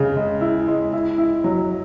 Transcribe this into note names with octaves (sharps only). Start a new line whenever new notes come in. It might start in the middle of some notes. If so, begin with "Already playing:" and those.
Already playing: C#3 G#3
G#3
E4
G#3
E4
E4
F#3